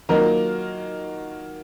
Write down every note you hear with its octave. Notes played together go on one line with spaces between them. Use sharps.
D#3 F#3 A#3 F4 A#4